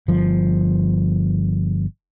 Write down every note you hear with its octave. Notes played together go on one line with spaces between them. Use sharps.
G1 F3